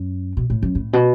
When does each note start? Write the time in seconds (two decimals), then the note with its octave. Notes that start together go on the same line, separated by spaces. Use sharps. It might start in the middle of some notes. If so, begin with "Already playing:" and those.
Already playing: F#2
0.37 B2
0.50 A2
0.63 F#2
0.75 A2
0.93 B2